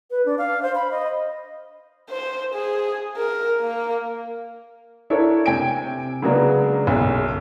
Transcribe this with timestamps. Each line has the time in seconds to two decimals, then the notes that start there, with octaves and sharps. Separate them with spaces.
0.11 B4
0.26 D4
0.38 F5
0.63 C5
0.75 B5
0.91 D#5
2.10 C5
2.54 G#4
3.17 A#4
3.61 A#3
5.10 D4 E4 A4 A#4 C#5
5.46 C3 G5 G#5 D7
6.22 C#3 F#3 G#3 A#3 B3 D4
6.87 B1 F#2